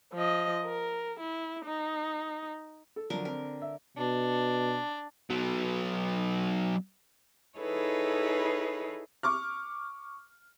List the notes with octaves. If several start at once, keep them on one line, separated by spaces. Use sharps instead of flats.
F3 D#5
A#4
E4
D#4
A4
D3 F3 F#3 A#4
C4 A#4
E5
B2 D4
F#3 B3
D#4 E4 G#4 A4 B4 C#5
C#6 D6 F6